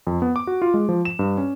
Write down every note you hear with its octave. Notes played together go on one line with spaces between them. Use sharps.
F2
B3
D6
F#4
F4
G#3
F3
E7
G2
C#4